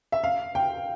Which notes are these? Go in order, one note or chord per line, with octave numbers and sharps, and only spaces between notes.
E5
F5
G5